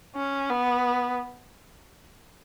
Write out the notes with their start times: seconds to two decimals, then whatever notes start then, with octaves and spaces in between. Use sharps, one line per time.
0.16 C#4
0.50 B3